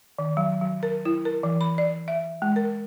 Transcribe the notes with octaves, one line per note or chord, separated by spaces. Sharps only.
D#3
F#3
F#3
A#4
E4
A#4
E3
B5
D5
E5
G#3
A#4